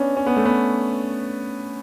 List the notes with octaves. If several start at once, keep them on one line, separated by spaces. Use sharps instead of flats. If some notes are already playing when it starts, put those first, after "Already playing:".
Already playing: B3 C#4 D4
C#4
B3
A3
B3